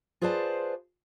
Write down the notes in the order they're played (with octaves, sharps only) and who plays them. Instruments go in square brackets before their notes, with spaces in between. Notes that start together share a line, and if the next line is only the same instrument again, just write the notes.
[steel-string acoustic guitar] F4 G#4 B4 C5 D5 A5